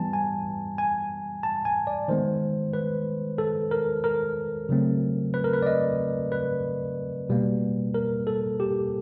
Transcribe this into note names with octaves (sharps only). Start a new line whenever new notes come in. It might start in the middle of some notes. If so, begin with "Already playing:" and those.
Already playing: E3 G3 B3 G#5 A5
G#5
G#5
A5
G#5
D5
D#3 G#3 B3 C5
B4
A4
A#4
A#4
C#3 F#3 A3 C4
B4
A#4
B4
D5
D#5
B4
B2 G3 A#3
A#4
A4
G4